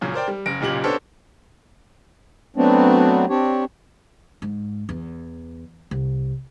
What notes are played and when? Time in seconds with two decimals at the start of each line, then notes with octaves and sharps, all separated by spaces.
0.01 F#2 A#2 C#3
0.14 A#4 C5 D5 G5
0.28 G3
0.46 F#1 A#6 D7
0.60 F#1 B1 A#2 G4 F#7
0.84 B3 D4 G4 A4 C5 C#5
2.56 F#3 A3 B3 C4 D4
3.29 C4 D4 G4 C#5
4.42 G#2
4.89 E2
5.91 C2